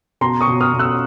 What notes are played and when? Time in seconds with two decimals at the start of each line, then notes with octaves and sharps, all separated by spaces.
0.21 B2 A#5 C6
0.41 C#6 D#6
0.47 B2
0.61 D#6 F6
0.74 B2
0.79 E6 F#6